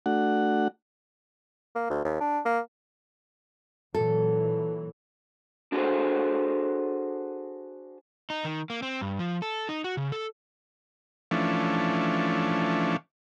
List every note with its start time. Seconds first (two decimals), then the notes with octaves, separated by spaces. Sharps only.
0.06 A3 D4 F#4 F#5
1.76 A#3
1.90 D2
2.05 D#2
2.20 D4
2.45 A#3
3.94 A#2 E3 F#3 A4
5.72 D4 F#4 G#4 A4 C5
8.30 D#4
8.45 D#3
8.70 A#3
8.82 C4
9.01 G2
9.19 F3
9.42 A4
9.69 D#4
9.84 F#4
9.97 C#3
10.12 A4
11.31 E3 F3 A3 C#4 D4